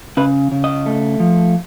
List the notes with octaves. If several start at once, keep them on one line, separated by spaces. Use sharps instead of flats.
C#3 B4
C#3
D#5
A3
F3